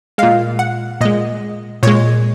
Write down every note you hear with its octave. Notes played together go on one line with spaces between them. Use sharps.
A#2 G#3 F5
F#5
A#2 G#3 D#5
A#2 G#3 C#5